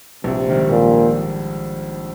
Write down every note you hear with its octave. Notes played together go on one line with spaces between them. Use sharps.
A#1 C3
G#2 D#3 G3
A#1 A#2
D#3